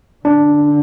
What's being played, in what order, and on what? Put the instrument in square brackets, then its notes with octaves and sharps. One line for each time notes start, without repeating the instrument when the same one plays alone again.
[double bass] D3 [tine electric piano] D4